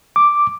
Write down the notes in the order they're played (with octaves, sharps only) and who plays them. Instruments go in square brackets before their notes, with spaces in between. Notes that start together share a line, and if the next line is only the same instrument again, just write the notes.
[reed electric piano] D6